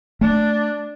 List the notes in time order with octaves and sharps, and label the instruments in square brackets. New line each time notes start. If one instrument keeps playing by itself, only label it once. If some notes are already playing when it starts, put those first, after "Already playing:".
[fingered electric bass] A3 [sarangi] D4